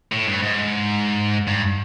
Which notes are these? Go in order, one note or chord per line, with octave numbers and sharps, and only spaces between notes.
A2
G2
G#2
G2